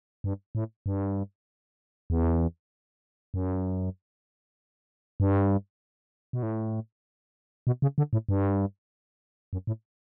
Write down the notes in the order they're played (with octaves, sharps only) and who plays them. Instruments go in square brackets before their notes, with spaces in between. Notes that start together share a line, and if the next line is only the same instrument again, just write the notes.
[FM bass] G2
A2
G2
E2
F#2
G2
B2
A2
B2
C#3
D3
A2
G2
F#2
A2